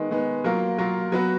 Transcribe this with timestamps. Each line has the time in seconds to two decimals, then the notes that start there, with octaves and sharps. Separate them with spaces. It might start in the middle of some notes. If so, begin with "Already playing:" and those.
Already playing: D#3 G#3 B3
0.10 D#3 G#3 B3
0.44 F#3 A#3 F4 A#4
0.78 F#3 A#3 F4 A#4
1.12 F#3 B3 F#4 B4